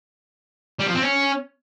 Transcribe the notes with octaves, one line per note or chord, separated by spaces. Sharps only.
G3
F3
C4
C#4